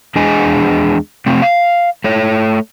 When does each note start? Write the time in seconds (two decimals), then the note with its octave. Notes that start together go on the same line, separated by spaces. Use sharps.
0.16 E2 G#3 D4 G#4 D#5 G#5
1.26 C3 A3 C4
1.42 F5
2.04 A3 C#5